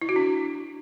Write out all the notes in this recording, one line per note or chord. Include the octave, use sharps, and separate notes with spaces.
E4
F#4
D4